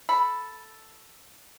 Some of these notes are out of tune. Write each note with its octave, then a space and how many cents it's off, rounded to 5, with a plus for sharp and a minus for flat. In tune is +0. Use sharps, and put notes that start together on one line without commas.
A4 +0 B5 +0